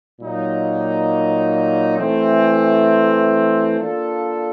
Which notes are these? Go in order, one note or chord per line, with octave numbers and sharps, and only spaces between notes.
A#2 F#3 A#3 D#4
E3 A3 C4
A#3 D4 F4 A4